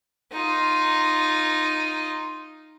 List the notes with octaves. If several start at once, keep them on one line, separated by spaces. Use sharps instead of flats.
D#4 F4